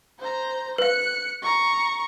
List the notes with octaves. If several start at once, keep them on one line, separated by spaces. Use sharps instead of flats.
C5 A#5
B4 F5 F#6 C#7
A#5 C#6